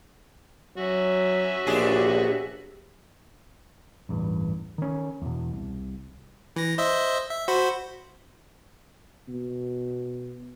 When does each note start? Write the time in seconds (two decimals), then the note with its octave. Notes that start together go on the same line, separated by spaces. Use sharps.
0.78 F#3 C#4 F#4 E5
1.67 A#1 B2 D4 G4 G#4
4.09 A1 E2 G2
4.78 D#3 C#4
5.22 E2 B2
5.52 C2
6.56 E3 A#6
6.78 C5 D#5 E5
7.30 E5
7.48 F#4 C5 B5
9.28 B2